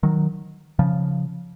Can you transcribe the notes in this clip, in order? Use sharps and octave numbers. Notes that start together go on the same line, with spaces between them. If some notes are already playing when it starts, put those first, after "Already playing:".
D#3 F#3
C#3 F3